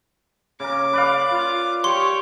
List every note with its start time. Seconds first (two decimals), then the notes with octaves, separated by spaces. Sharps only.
0.60 C#3 A#4 D6
0.93 B4 D5 F5
1.31 F4
1.84 G4 C#5 C6 C#6